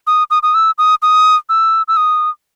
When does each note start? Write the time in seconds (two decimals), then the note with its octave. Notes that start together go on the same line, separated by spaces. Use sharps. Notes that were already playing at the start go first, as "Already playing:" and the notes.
0.07 D#6
0.31 D#6
0.43 D#6
0.55 E6
0.78 D#6
1.02 D#6
1.49 E6
1.88 E6
1.97 D#6